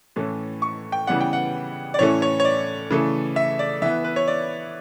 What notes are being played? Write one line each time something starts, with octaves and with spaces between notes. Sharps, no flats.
A2 E3 A3 C#4
C#6
G5
C#3 E3 G3 B3 F#5
G5
F#5
D5
A2 E3 A3 C#4 C#5
C#5
C#5
D5
C#3 E3 A3
E5
D5
E3 B3 E5
B4
C#5
D5